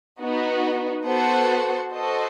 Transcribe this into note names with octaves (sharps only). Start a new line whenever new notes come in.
B3 D#4 F#4
B3 F#4 A4 C5 F#5
F#4 A4 C5 D#5